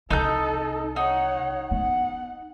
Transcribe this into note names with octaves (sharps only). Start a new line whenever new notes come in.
C2 D#4 A4 D#5 G6
D#4 C#5 F#5
B3 F#5